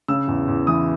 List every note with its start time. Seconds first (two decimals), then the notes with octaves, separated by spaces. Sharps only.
0.08 C#3 E6
0.28 E2
0.48 E2
0.67 E3 D#6